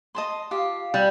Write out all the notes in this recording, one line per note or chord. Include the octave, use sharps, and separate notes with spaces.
D#5 A5 C6
F4 G4 F5
G3 F#5